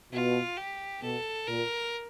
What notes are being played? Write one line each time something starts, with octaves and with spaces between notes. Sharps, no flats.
B2 F4
G4
B2 A4
A#2 A#4